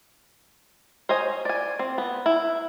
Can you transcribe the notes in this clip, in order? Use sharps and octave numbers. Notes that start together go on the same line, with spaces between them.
C5 C#5 D#5 G#5
D5 G#5
C4
B3
E4